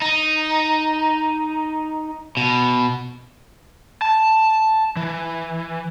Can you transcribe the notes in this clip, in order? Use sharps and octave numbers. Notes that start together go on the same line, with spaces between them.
D#4
B2
A5
E3